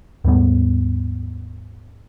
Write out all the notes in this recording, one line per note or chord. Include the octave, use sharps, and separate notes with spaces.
D#2 G#2 G3 B3